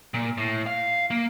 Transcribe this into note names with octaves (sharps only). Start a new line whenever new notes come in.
A#2
A2
F5
A#3